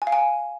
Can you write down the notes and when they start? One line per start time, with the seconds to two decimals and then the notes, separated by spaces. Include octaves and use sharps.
0.02 G#5
0.07 F5
0.12 G#5